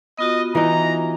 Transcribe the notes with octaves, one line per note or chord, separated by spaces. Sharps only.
B3 F4 F#4 D#5
E3 D#4 A#5